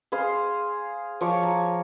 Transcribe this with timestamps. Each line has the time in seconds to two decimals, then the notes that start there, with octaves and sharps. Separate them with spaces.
0.12 G#4 C5 F5 C6
1.21 F3 C#5 C#6 D6
1.43 A#5